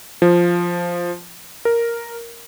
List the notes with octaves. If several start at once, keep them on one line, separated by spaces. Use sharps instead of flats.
F3
A#4